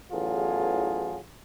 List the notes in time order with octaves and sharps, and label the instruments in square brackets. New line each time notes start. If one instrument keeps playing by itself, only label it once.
[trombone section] A1 E2 F#3 F4 G#4 A4